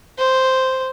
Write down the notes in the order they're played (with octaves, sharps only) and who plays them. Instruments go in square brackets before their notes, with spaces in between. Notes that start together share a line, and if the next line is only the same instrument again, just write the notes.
[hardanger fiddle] C5